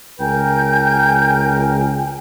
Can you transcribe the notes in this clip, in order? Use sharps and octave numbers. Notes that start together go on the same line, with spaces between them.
C#2 A#4 G5 G#5 G6